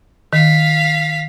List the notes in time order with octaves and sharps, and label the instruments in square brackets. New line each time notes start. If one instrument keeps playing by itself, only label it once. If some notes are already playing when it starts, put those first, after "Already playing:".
[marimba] D#3 [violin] F5 B6